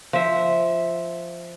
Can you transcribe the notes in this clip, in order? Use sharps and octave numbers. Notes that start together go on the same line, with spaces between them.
F3 E5